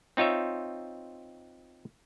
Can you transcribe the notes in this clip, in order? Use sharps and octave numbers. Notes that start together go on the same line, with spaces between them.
C4 D#4 F4 C#5 E5